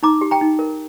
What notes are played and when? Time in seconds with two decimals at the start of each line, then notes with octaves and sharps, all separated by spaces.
0.03 D#4 A#5 D6
0.21 G4
0.31 G5 A#5
0.41 D#4
0.59 A#4